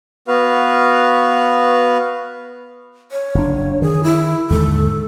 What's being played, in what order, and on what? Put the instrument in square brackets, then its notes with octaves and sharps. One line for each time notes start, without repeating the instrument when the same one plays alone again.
[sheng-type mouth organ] B3 F#4 B4 F5
[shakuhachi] C#5
[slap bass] F#1 D4
[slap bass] D#3 [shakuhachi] G#4
[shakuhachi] E4
[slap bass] D#2 G#2 D3 [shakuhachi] A4